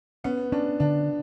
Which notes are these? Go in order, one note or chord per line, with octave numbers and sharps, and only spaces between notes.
B3 C#4
C#4 D4
D3 D4